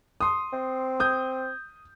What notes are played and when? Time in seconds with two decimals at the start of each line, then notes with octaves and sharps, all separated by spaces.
0.21 C6 D#6
0.53 C4
1.00 D#6 G6